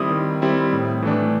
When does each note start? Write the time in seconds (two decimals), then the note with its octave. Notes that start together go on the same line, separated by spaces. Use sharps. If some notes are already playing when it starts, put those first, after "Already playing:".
Already playing: D#3 G3 C4 E4 D#6
0.11 D#3
0.42 G3 C4 E4
0.73 A2
1.02 E3 A3 D4